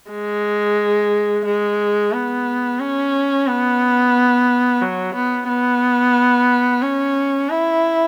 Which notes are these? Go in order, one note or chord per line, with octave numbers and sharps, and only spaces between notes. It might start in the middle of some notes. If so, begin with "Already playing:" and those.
G#3
G#3
B3
C#4
B3
F#3
B3
B3
C#4
E4